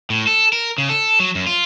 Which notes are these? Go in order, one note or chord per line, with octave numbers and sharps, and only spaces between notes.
A2
A4
A#4
C#3
A4
F#3
F#2
F4